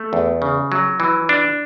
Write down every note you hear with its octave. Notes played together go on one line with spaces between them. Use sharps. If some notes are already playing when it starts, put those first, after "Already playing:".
Already playing: A3
E2
C#3
F#3
E3
D4